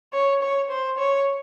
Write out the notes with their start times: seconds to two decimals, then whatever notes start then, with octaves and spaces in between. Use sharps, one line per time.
0.13 C#5
0.42 C#5
0.70 C5
0.98 C#5